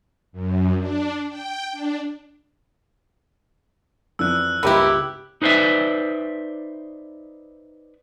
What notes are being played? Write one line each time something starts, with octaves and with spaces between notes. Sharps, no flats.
F#2
D4
G5
D4
F2 E3 D4 E6 F#6
C#2 G2 A#3 B3 D#4 E4 G4
D#4 B4 C5 D5 E5